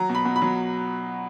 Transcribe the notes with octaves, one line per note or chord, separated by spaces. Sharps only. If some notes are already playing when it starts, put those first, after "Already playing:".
Already playing: F#3 A#5
B2
B5
B2
B5
F#3